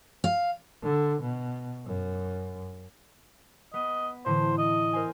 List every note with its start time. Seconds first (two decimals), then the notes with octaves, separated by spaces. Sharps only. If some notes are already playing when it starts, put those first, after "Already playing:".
0.24 F5
0.84 D3
1.22 B2
1.86 F#2
3.74 B3 D#5
4.26 A2 D3 E3 C5
4.58 D#5
4.93 A#4 C5 G#5